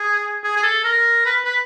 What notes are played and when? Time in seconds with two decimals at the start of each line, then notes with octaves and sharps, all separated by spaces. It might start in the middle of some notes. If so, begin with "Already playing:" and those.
Already playing: G#4
0.44 G#4
0.56 G#4
0.63 A4
0.84 A#4
1.25 B4
1.45 B4